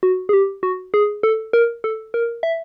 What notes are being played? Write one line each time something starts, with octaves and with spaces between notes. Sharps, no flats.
F#4
G#4
G4
F#4
G#4
A4
A#4
A4
A#4
E5